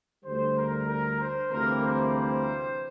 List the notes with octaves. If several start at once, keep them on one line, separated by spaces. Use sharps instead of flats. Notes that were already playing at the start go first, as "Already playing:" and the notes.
D2 D3 G3 C5
A#4
A#4
C5
D2 C3 E3 G3 A#3 A#4
C5
C5